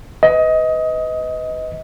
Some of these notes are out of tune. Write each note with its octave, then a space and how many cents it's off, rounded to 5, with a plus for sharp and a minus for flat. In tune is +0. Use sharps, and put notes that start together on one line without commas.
B4 +20 D#5 +20